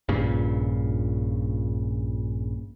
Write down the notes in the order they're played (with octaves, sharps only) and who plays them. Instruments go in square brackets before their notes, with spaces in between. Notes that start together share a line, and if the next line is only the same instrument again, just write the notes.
[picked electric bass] A#1 G2 A#2 C#3